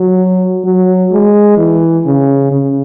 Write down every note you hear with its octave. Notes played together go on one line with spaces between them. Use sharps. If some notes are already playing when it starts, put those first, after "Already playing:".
Already playing: F#3
F#3
G#3
E3
C#3
C#3